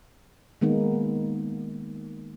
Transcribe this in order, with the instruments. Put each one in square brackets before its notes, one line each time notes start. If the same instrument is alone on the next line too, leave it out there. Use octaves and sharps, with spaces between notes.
[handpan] D#3 G#3 A#3 B3 D#4